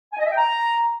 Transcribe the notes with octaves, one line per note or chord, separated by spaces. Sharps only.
G#5
D#5
E5
G5
A#5